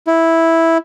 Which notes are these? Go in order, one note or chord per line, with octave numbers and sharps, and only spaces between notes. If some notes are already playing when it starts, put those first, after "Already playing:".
E4